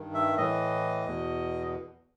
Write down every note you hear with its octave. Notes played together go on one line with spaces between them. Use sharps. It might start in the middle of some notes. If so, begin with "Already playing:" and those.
Already playing: G2 D#3
E5
A2 E3 D#5
E2 B2